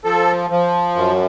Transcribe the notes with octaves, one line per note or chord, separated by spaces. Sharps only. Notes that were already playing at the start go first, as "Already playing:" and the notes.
F3 A4
F3
F#2